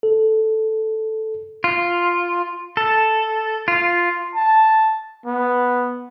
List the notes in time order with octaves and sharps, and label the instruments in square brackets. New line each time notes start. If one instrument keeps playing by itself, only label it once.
[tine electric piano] A4
[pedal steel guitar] F4
A4
F4
[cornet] A5
B3